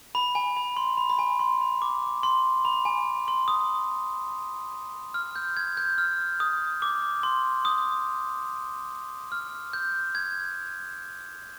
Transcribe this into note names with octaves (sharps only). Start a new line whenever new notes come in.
B5
G#5
B5
C6
B5
B5
G#5
C6
B5
D6
C6
B5
G#5
C6
D#6
F6
G6
G#6
G6
F6
D#6
D6
C6
D#6
F6
G6
G#6